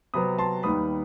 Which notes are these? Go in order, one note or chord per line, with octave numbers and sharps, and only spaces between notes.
C3 F#3 B3 B5 D#6
A5 C6
D#2 D#3 G3 B3 B5 D#6